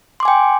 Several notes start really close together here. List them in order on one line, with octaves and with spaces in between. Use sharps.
C6 D6 G#5 G5